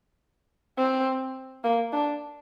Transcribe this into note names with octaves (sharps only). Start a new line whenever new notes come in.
C4
A#3
D4